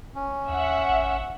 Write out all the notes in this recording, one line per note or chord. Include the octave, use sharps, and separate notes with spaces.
C#4
D#2 E5 F#5
A1